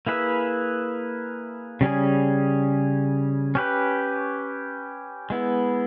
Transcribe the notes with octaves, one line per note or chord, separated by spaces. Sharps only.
A#3 E4 G#4 B4 E5
C#3 G3 C#4 G#4
C#4 G4 B4
G#3 B3 E4